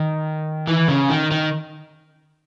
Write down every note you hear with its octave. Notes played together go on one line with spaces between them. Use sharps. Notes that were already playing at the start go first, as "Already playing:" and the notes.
Already playing: D#3
E3
C#3
D#3
D#3